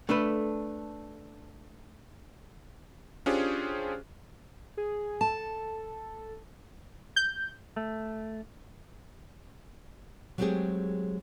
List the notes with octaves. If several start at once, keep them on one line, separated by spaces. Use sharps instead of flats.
A3 D4 A4 B4
C#4 D4 F4 G4 G#4 C5
G#4
A4 A5
G6
A3
F#3 G#3 A3 C4 G4 G#4